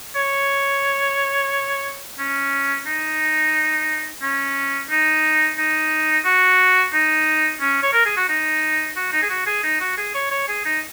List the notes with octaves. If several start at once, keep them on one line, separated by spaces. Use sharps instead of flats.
C#5
C#4
D#4
C#4
D#4
D#4
F#4
D#4
C#4
C#5
A#4
G#4
F#4
D#4
F#4
D#4
G#4
F#4
G#4
D#4
F#4
G#4
C#5
C#5
G#4
D#4